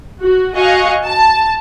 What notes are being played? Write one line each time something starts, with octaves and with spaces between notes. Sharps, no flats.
F#4
F#4 D#5 F5 G#5 C#6
A5